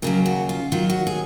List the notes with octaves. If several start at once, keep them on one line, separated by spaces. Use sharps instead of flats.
D#2 C#3 F#3 A#4
F#4
F4
G#2 D#3 F#3 F4
F#4
G#4